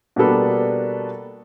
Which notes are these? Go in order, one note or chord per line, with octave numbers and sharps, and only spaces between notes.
B2 G3 A#3 D4 A4 B4